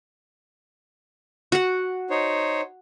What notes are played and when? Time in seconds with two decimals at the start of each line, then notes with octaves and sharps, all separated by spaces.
1.52 F#4 F#5
2.10 D#4 C5 C#5